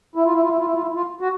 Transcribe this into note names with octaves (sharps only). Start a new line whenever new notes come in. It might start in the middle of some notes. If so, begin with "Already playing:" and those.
E4
F4
E4
F4
E4
F4
E4
F4
E4
F4
F#4